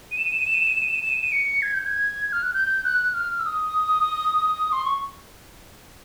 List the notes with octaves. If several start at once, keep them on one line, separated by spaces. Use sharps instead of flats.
D#7
E7
D#7
E7
D#7
E7
D#7
E7
D#7
E7
D#7
E7
D#7
E7
D#7
E7
D#7
C#7
G#6
G6
G#6
F6
F#6
G6
F#6
F6
E6
D#6
C6
C#6